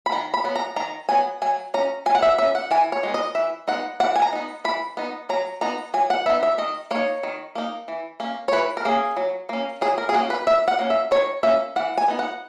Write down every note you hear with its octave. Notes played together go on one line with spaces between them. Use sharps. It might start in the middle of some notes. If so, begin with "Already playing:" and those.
B5
D#3 A#5
B5
F#3 B3
A#5
D#3 A#5
F#3 B3 G#5
F#3 G#5
C#4 A#5
F#3 G#5
F#5
E5
C#4 E5
F#5
E3 G#5
C#5
G#3 B3 D#4
D#5
E3 E5
G#3 B3 D#4 F#5
E3 F#5
G#5
A#5
B3 D#4
E3 B5
B3 D#4
F#3 A#5
B3 D#4 A#5
F#3 G#5
F#5
B3 D#4 E5
E5
D#3 D#5
A#3 D#4 C#5
D#3
A#3 D#4
E3
A#3 C#4
C#5
E3 B4
A#4
A#3 C#4 G#4
F#3
A#3 C#4
F#3 G#4
A#4
G#4
A#3 C#4 F#4
B4
D#3 E5
F#5
A#3 C#4
E5
D#3 C#5
A#3 C#4 E5
E3 F#5
G#5
B3 D#4
F#5